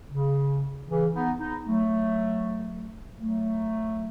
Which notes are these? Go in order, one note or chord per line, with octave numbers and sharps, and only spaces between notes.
C#3
C#3 E3
B3 D#4
B3 D#4
F#3 A3
F#3 A3